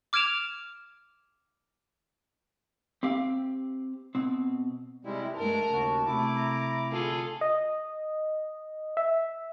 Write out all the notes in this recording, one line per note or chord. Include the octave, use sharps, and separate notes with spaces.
D6 F6 G#6 D7 E7 F7
C4 G4 F5
B2 C4
C3 G3 G#3 E4
G2 G#3 A3 A#4 A5
D#2 C#3 F#4
C3 A3 E4 D6
A#5
D3 F4 G#4 A4
D#5
E5